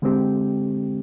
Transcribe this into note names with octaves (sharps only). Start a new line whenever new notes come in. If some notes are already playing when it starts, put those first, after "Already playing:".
D3 G#3 C4 G4